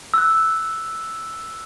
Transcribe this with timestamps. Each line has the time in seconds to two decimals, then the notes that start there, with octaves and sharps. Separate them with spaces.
0.14 E6 F#6